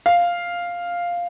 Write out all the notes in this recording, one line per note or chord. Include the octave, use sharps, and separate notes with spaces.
F5